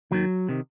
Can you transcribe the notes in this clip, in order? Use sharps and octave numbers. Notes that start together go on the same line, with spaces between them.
D#2 D#3 F#3
C3 D#3